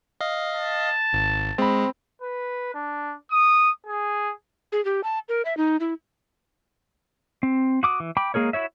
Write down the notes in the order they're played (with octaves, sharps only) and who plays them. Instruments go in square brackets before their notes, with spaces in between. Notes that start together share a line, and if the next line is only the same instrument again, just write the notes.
[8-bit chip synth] D#5 F5
[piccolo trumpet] A5
[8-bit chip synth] G#1
[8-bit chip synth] G#3 [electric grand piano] C4 B5
[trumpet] B4
D4
D#6
G#4
[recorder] G#4
G4
A5
A#4
E5
D#4
E4
[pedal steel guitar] C4
F#4 D6 D#6
E3
G5 B5 D6
G#3 A#3 G#4 A#4 C#5
E4 F#4 C#5 E5